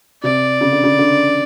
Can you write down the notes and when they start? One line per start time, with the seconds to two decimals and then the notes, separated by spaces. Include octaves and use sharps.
0.23 C3 D5
0.61 C#3
0.72 D3
0.84 C#3
0.99 D3